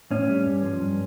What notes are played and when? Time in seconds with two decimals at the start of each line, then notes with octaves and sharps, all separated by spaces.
0.11 A2 C#4
0.29 G3
0.45 G2
0.63 F3
0.80 G2